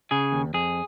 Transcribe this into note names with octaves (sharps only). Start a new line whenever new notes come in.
C#3 G#4
D#2
F2 G#4